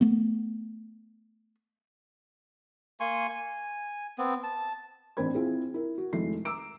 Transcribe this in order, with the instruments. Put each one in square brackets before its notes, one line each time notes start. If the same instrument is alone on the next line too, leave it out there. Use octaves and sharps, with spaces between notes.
[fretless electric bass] A3 B3
[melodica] A#3 G#5 C6 C#6
G#5
B3 C4
A5
[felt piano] A1 C4 D4 C5 B5 G#6
C4 E4 F4 G#4
E4 A#4
F#4
F1 G#3 A3 E4 C7
A#5 D6 E6 D7